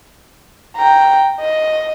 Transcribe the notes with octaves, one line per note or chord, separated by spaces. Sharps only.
G5 A#5
D#5